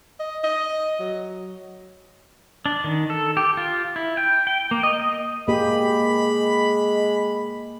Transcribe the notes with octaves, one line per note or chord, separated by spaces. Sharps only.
D#5
D#5
F#3
D4
D#3
A4
G4
F4
E4
G5
G5
A#3
D#5
D#5
G#3 A#3 G4 B5